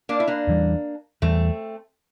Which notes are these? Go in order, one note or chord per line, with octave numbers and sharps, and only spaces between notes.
A#3 D4
E4
A#3 D4
E2 E3 G3
E2 E3 G3 A3 C4